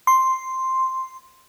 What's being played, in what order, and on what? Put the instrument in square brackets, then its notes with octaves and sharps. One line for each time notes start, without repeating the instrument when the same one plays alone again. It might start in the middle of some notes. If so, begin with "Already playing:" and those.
[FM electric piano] C6